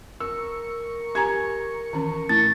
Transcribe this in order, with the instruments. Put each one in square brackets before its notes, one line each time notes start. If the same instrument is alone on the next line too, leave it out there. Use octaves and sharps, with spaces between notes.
[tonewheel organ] A#4 C#6 [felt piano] E6
[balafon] G4 G#5 A#5 [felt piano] G#6
[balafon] D#3 E3 C#4
[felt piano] A2 [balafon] A5 [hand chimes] A6